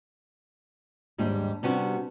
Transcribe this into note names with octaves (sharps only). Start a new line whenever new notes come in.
D#2 G#2 G3 D4
C3 G3 B3 C#4 D4 F#4